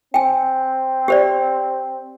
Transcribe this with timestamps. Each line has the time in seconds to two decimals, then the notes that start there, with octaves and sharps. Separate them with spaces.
0.14 C4 G5 G#5
1.08 G4 C5 D5